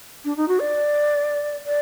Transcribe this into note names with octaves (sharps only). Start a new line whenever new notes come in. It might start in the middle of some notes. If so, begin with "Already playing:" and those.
D4
D#4
F#4
D5
D5